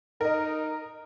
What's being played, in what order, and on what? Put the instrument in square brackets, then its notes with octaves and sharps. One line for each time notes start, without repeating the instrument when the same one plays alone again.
[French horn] D#4 [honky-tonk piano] A#4 D#5